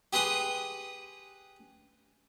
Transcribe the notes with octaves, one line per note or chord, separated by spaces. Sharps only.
G4 G#4 B4 C6 D#6